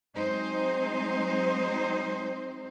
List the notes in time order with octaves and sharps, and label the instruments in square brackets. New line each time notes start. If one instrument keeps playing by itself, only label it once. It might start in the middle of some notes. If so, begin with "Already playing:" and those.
[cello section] F#3 G#3 C4 D#4 C5